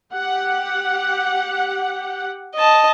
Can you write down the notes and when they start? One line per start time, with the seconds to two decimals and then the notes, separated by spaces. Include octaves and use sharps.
0.13 G4 F#5
2.56 D#5 A5